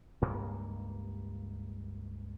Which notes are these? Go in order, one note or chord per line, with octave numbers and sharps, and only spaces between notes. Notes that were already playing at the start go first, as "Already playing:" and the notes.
C#2 G2 A#3